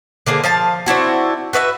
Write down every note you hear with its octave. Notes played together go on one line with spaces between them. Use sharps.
D3 A#3 G#4 C5
F3 F5 A5
C4 D4 E4 F#4
F#4 B4 D5 E5